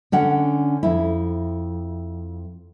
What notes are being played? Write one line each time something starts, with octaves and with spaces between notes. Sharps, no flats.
D3 C#4 F#5
F2 E4